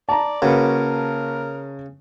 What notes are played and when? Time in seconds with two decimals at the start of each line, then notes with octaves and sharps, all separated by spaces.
0.09 D5 A5 A#5
0.42 C#3 A#3 F#4 A#4 B4